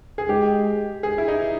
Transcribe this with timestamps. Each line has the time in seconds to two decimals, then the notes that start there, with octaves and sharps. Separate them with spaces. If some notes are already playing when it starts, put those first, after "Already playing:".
0.18 G#4
0.29 G#3 G4
1.03 G#4
1.18 E4
1.28 D#4